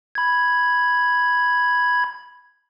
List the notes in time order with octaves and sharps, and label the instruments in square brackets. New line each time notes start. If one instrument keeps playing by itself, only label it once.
[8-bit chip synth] B5 G#6